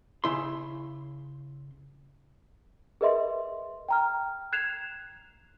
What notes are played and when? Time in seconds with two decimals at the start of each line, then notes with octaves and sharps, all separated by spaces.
0.24 C#3 E4 C6
3.01 G#4 A#4 B4 D#5 E5 C6
3.88 G5 A#5 F6
4.53 F#6 G#6 C7 E7 F7